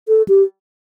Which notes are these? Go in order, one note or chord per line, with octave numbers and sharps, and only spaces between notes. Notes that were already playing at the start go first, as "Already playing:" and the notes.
A4
G4